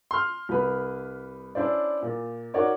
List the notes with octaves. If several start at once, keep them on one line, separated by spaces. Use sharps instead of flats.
C6 F6
C2 B4
C#4 D4 E4 C5 D5
A#2
D#4 F#4 A#4 C#5 D5 D6